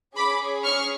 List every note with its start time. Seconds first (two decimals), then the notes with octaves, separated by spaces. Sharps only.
0.16 C#4 G#4 B5 D6
0.64 C#6 F6